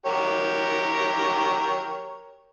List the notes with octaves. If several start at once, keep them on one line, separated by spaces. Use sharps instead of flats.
G4 A#4 C#5